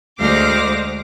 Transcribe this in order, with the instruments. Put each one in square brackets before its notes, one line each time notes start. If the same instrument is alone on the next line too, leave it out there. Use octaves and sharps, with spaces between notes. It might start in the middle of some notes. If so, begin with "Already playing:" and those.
[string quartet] D2 G#3 C5 F5 D6 A#6